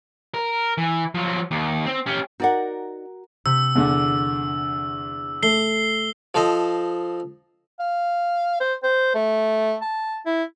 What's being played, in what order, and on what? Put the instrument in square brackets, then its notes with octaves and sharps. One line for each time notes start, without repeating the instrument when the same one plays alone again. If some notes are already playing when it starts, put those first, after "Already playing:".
[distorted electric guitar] A#4
E3
F3 F#3
D#2
C4
C#4 G4
[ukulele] D#4 D5 F#5 [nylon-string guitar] F#4 A#4
[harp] C3 G6 B6 [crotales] E6
[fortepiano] E2 D3
[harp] A3 [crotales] C7 G7
[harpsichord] F3 A4 C5 D#5
[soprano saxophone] F5
C5
C5
A3
A5
E4